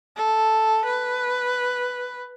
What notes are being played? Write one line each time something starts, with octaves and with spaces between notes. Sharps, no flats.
A4
B4